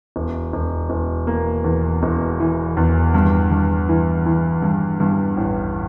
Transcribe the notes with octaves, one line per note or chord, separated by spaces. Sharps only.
E1
E1
E1
A#3
E2
E1
E3
E2
G2
G2
E3
E3
G2
G2
A1